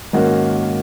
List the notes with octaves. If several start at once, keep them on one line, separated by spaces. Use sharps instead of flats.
G#2 D#3 A#3 C#4 F#4